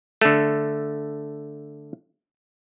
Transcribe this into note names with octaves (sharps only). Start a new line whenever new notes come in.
D3 A3